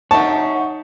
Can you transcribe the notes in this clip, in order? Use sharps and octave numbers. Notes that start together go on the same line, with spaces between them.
D#4 C#5 E5 F#5 A5 C#6